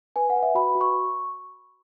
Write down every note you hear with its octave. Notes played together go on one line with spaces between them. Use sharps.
B4 G#5
F#5
B4
E5
F#4 B5
F#4
C#6